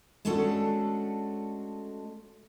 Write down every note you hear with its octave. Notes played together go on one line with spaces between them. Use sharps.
G#3 A3 C#4 D4 F#4 A4